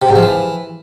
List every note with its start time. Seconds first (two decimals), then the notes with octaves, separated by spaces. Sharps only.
0.02 C3
0.09 G#2
0.16 F3
0.23 E3